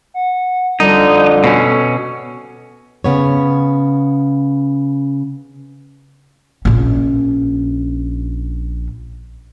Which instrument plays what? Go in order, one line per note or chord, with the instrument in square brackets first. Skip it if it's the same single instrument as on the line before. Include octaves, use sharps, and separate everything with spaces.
[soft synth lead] F#5
[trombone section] F2 D3 [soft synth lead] G3 [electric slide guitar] D#4
[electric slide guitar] B2 C#4 [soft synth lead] A4
[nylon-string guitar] C#3 B3 C#5
[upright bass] A#1 C#4